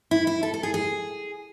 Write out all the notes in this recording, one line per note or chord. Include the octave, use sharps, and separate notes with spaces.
E4
E4
A4
A4
G#4
G#4